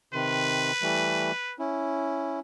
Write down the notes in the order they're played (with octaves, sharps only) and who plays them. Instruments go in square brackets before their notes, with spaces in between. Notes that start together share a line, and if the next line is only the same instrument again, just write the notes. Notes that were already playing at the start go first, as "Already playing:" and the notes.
[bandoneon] C3 D#3 C6 [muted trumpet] B4
[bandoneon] E3 G3 A3
C#4 E4